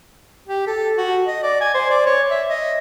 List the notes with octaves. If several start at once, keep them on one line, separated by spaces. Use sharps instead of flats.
G4
A4
F#4
D#5
D5
G#5
C5
D5
C#5
E5
D#5